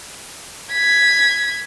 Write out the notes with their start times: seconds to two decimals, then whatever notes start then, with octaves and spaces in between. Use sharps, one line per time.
0.73 G#6 B6